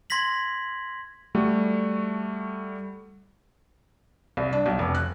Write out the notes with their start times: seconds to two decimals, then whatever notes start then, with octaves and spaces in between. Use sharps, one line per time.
0.10 C6 G#6 A#6 B6 F#7
1.35 G3 A3 F#4
4.37 C2
4.53 D4
4.66 B1
4.79 F1
4.95 F#6